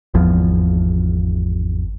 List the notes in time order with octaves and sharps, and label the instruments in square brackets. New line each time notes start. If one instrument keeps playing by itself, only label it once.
[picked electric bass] G#1 E2 F3